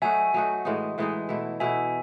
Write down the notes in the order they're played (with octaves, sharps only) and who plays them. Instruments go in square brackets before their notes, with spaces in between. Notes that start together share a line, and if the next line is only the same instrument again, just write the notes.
[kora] F#3 A3 D#4 F#4 [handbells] E5 G#5
[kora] F#3 A3 D#4 F#4
A2 E3 G#3 D#4
A2 E3 G#3 D#4
B2 A3 E4
[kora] B2 A3 E4 [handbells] E5 G#5